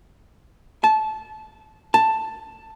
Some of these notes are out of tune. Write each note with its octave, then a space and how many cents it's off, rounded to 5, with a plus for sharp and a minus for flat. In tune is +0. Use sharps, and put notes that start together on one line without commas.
A5 -20
A5 +5